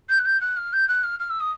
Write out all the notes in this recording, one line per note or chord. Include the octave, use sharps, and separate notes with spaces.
G6
F#6
G6
F#6
F6
G6
F#6
F6
F6
E6
D#6